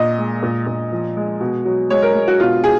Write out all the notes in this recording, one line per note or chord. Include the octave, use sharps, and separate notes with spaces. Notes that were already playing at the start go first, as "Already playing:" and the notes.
Already playing: A#2 D#5
G#3
A#2
A#2
F3
G#3
B2
F#3
G#3 C#5
A#4
G#3
F#4
B2 F4
G#4